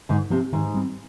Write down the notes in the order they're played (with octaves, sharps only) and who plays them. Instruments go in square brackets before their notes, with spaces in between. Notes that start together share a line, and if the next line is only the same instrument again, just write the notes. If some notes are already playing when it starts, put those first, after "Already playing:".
[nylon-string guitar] G#2 [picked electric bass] D3
[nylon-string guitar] C3 [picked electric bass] F3 C4
[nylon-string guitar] G#2 [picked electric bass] D#3
[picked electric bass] G3 C4